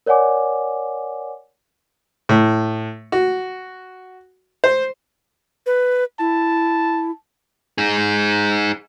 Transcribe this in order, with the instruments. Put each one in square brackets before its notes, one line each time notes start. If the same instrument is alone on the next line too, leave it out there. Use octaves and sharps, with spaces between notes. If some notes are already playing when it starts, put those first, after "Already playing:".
[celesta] A#4 C#5 D5 F#5 G#5 D6
[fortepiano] A2
F#4
C5
[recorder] B4
[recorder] E4 [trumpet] A5
[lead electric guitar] D#4 G#4